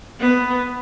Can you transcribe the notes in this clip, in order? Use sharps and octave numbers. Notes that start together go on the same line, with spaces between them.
B3